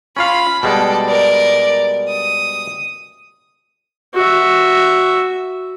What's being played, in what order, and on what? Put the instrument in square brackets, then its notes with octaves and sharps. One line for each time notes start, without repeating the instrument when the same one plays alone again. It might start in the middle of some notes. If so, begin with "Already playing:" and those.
[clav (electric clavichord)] C#4 F4 F5 [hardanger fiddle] B5
[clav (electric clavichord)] B2 G3 G#3 [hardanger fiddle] A4 D5
[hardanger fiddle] A#4 D5
D#6
[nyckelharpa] F#4 E5